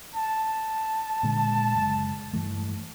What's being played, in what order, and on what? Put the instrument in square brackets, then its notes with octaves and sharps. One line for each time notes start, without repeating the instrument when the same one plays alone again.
[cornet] A5
[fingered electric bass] A#2 D3 G#3
F#1 G#3
G2 E3 A3